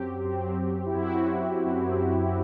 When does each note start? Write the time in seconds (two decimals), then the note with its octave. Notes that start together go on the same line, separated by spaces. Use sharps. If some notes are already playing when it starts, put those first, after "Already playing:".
Already playing: F#2 F#3 C4 G4
0.24 F#2 F#3 C4
0.86 E4
0.95 F#2 F#3 C4 F#4
1.66 F#2 F#3 C4